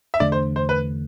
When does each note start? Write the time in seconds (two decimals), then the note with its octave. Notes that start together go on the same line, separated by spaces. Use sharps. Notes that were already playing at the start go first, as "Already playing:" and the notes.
0.14 E5
0.20 E2 D3 A3 D4 D5
0.32 C5
0.56 C5
0.69 B4